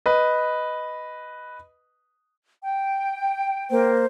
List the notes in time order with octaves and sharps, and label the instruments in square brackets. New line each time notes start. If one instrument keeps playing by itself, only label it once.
[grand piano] B4 D#5
[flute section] G5
[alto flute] A#3 [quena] C5